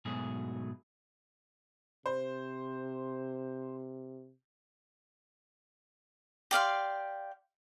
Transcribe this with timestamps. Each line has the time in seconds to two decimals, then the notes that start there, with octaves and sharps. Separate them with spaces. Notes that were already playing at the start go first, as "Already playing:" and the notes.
0.05 G#2 B2 F#3 A3 G#4
2.06 C3 C5
6.51 G4 D5 F5 C6